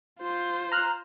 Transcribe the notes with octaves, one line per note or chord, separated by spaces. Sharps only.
F4 C5
A#5 F6 F#6